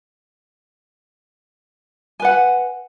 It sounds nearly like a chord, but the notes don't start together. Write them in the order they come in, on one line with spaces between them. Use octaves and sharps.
G#5 B4 F#5